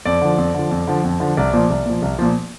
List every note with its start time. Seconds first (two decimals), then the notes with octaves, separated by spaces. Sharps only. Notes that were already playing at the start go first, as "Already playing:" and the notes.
0.05 F2 D5
0.21 D3 F3
0.38 F2
0.54 D3 F3
0.71 F2
0.88 D3 F3
1.04 F2
1.20 D3 F3
1.37 C2 D5
1.53 A#2 F3
1.70 C2
1.86 A#2 F3
2.02 C2
2.19 A#2 F3